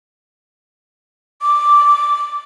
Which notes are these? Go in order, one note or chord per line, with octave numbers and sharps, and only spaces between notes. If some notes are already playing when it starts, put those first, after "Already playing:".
D6